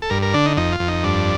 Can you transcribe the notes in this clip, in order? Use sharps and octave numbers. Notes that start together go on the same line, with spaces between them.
A4
G2 A#4
A#4
D3 D4
D#4
F2 D#4
F4
F2
D#4
G2 D4